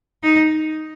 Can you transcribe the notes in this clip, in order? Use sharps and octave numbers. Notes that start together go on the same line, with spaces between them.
D#4